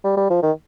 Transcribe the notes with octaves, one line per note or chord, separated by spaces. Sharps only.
G3
G3
F3
D#3